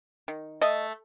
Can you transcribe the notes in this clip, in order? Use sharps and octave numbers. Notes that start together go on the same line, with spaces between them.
D#3
A3 D#5